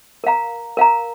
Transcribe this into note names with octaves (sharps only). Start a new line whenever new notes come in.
A#4 F5 A#5
A#4 F5 A#5